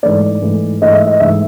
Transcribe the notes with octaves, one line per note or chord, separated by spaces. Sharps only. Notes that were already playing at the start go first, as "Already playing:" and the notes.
G#2 E3 A3 D5
G#2 E3 A3
G#2 E3 A3 D#5
E5
D#5
G#2 E3 A3 E5